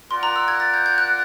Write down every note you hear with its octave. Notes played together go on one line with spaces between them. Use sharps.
F4 A#4 D5 F#5 C6
A#5
E6
G#6
A6
G6
G6
F#6